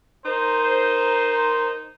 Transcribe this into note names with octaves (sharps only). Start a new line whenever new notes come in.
D#4 A#4 C5